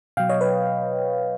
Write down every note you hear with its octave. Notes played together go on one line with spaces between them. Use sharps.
B2 F#3 F5 G5
C#5 D#5
B4 C#5